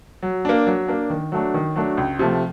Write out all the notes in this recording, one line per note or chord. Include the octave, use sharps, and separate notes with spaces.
F#3
A#3 D4
F#3
A#3 D4
D#3
F#3 A3 D4
D#3
F#3 A3 D4
C#2
C3 F3 A3